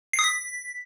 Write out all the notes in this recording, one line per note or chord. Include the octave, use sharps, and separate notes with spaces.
C7
D#6
B6